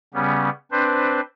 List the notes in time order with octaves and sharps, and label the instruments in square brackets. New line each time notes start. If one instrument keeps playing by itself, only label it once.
[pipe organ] C#3 G3 B3 C#4
C4 D4 B4 C5